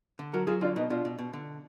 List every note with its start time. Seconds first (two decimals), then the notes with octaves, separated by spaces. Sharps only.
0.19 D3
0.33 F#3 F#4 A#4
0.47 F#3 F4 G#4
0.61 D3 D4 F4
0.76 B2 B3 D#4
0.90 B2 D4 F4
1.05 B2
1.19 B2
1.33 D3